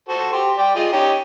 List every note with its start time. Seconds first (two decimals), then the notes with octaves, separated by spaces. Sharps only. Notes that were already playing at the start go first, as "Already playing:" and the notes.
0.09 F#4 A4 C5
0.32 G4 C6
0.57 D5 G5
0.75 F4 G#4 D#5
0.92 C#4 D#4 G4